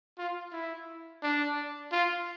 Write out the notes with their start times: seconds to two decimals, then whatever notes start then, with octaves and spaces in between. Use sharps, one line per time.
0.18 F4
0.52 E4
1.22 D4
1.92 F4